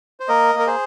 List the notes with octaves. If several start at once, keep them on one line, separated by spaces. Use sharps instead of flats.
C5
A#3 A#4 D#5
A#3 A#4
G#4 C5